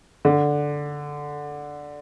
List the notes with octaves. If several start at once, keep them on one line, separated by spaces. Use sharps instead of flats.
D3